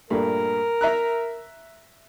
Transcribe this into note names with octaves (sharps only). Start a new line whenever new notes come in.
G2 A#2 A3 A#4
E5 A#5 F#6